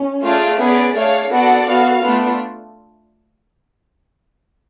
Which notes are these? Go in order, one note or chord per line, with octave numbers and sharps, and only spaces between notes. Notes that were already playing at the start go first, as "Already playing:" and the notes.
Already playing: C#4
A3 F4 G#4 D5 F5
B3 C#4 G#4 B4 D5
A3 D4 G#4 C#5 F5
B3 D4 F#4 A4 D5 F#5
B3 F#4 A4 F5
A3 B3 D4 F4 A4